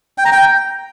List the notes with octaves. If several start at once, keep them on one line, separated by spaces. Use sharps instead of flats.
G5
A#5
G5